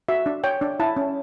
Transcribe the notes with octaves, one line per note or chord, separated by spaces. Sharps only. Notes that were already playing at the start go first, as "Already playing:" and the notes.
F#4 E5
D4
C#5 G5
D4
E4 A5
C#4